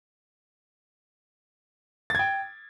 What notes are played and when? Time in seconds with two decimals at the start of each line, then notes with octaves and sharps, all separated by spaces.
2.10 A6
2.15 G#6
2.19 G5